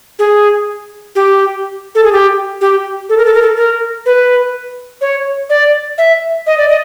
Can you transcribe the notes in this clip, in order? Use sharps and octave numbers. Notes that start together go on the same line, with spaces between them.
G#4
G4
A4
G#4
G4
G4
A4
A#4
A4
A#4
A4
A#4
B4
C#5
D5
E5
D#5
D5
D#5